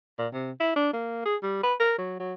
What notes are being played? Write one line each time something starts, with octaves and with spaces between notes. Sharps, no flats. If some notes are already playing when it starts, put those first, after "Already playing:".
A#2
C3
E4
D4
A#3
G#4
G3
B4
A#4
F#3
F#3